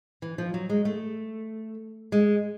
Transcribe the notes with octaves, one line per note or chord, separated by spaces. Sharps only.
E3
F3
F#3
G#3
A3
G#3